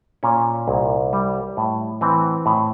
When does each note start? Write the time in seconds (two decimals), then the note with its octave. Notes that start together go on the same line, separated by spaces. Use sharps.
0.23 A#2 C#4
0.68 C2
1.13 G3
1.57 A2
2.01 E3 C4
2.46 A2